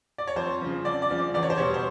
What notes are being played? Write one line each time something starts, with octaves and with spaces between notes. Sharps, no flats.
D5
C#5
F2 C5
C#3 F3
F2 D5
D5
C#3 F3
D5
E2 D5
C#5
C5
B2 G3 C#5
C5